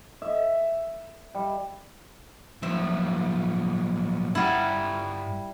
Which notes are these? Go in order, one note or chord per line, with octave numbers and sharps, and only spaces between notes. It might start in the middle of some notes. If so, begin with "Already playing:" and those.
E5
G3
B1 F3 E5
G2 G3 E4 F#5